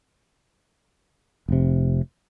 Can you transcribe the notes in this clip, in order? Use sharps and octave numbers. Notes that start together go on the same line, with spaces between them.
F1 C3